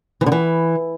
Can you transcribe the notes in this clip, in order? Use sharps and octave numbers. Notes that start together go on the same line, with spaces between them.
E3
D3
E3